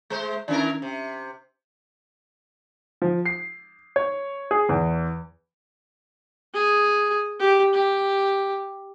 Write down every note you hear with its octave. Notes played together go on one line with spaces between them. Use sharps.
G#3 C5
D#3 C#4 D4 E4 A#4 D5
C3
F3
C7
C#5
G#4
E2
G#4
G4
G4